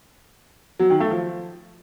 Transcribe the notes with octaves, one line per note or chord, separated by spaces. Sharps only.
F#3
D#3
A3
F3